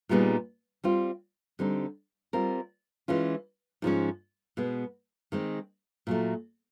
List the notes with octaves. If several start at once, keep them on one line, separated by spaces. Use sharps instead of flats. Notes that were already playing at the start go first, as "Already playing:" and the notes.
A#2 G3 B3 D#4 G#4
G3 C4 F4
D3 G3 C4 D#4
G3 C4 F4 A#4
E3 G#3 C#4 F4
G#2 F3 G#3 C#4
B2 G#3 B3
D#3 G#3 C4
A#2 F#3 A3